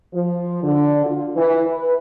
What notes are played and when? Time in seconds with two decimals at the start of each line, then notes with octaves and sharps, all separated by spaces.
0.14 F3
0.63 D3
1.05 F4
1.36 E3
1.67 B4